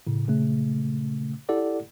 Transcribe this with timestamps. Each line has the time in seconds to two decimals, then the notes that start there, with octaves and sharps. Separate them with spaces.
0.07 A2 C#3
0.27 A#2 C#3 A3
1.49 E4 G4 A4 D5 F#5